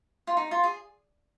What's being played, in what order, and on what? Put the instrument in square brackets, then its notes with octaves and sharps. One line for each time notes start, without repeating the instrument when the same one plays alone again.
[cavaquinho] F4
D#4
F4
G#4